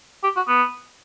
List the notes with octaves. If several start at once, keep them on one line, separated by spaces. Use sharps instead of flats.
G4
F#4
B3